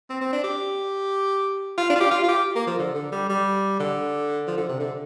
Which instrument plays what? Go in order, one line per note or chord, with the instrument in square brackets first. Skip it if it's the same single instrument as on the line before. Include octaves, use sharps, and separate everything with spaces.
[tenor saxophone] C4
C4
D4
G4
F4
D4
F4
G4
F4
F4
G4
A#3
F3
D3
D3
G3
G3
D3
F3
D3
C3
D3